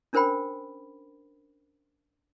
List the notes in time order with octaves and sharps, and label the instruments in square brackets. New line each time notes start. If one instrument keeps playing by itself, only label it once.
[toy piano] C#4 D4 A#4 C5 G5 B5